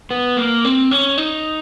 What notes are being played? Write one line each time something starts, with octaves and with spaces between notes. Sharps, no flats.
B3
A#3
C4
C#4
D#4